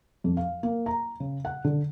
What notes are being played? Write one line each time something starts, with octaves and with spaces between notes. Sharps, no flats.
F2
F5
A#3
A#5
C#3
F#5
D3